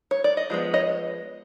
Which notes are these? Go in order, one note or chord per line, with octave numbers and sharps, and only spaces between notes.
C#5
D5
D#5
F3 G#3 B3
C#5 D#5